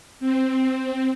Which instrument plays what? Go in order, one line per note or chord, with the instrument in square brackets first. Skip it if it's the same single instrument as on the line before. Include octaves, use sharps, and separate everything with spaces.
[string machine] C4